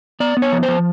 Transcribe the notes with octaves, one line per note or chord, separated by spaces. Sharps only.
B3 D5
B3
C#5
F3
C5
F3